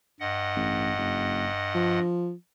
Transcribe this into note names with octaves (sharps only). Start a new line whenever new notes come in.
G2 D#5 F#5
A1
F#1
F3